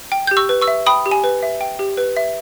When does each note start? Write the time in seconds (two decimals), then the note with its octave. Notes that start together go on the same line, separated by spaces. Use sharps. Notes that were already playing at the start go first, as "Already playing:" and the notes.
0.12 G5
0.27 G4 G6
0.37 C#6 E6
0.49 B4
0.62 C#6 E6
0.68 E5
0.86 G5 B5 D#6
1.06 G4
1.11 G#5
1.24 B4
1.43 E5
1.61 G5
1.79 G4
1.97 B4
2.17 E5